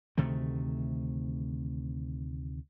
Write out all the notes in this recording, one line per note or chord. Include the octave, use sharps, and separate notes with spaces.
D2 C3 D#3 A3